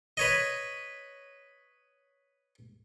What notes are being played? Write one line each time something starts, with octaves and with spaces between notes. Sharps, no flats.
B4 C#5 D#5